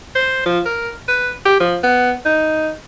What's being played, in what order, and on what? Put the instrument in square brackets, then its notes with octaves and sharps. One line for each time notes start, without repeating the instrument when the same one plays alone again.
[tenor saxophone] C5
F3
A#4
B4
G4
F3
B3
D#4